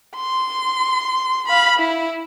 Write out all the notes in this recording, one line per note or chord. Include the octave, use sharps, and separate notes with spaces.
C6
F5 B5
E4